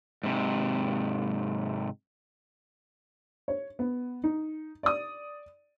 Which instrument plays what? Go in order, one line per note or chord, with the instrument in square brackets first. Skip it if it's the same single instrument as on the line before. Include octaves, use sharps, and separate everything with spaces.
[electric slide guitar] G#2 C3
[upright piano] C#5
B3
D#4
D5 D#6